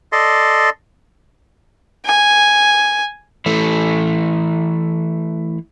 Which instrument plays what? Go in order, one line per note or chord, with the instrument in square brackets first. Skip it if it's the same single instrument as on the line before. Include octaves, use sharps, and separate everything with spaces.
[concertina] A4 D5 D#5 C6
[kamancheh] G#5
[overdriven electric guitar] E3 A3